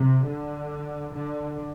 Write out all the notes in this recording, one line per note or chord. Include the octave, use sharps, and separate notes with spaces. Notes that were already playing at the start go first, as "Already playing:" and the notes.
Already playing: C3
D3
D3